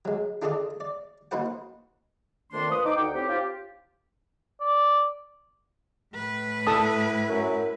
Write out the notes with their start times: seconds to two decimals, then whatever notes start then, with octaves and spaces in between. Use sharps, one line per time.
0.05 F#3 G#3
0.42 D4 F4 G#4 A4 D5 D#5
0.80 D5
1.31 A#3 D#4 F#4 B4 C5 F#5
2.52 F2 A#2 D#3 A3 D4 C6
2.70 F3 B4 D#6
2.85 D#4 D6
2.97 D2 F#5 G5
3.14 C4 C#4 D#4 E4 G4
3.28 F4 G4
4.61 D5
6.14 A2 B4
6.67 E4 A4 A5 D#6
7.29 F#2